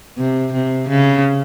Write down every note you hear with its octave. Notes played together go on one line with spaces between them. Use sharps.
C3
C3
C#3